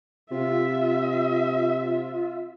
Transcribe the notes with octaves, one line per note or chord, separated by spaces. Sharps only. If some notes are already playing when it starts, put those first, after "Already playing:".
C3 F4 E5